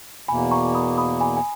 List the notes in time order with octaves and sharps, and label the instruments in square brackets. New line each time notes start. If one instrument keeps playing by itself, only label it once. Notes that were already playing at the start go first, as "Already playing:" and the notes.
[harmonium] E2 B2 A#3 [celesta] G#5 B5
[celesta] A#5 C#6
B5 D#6
B5 D#6
G#5 B5
G#5